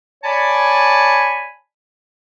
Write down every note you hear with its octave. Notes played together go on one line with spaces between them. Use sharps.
C#5 D5 G#5 A5 B5